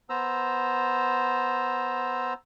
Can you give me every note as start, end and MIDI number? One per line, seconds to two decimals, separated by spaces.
0.09 2.33 59
0.09 2.33 72
0.09 2.33 82
0.09 2.33 88